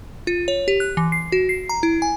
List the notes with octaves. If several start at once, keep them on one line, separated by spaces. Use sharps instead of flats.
F4
C#5
G4
F#6
E3
C7
F#4
C7
A#5
E4
G#5